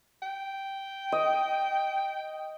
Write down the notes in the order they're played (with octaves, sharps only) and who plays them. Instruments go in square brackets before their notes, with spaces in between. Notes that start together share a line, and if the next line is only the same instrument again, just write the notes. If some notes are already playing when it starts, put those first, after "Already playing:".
[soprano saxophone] G5
[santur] D#5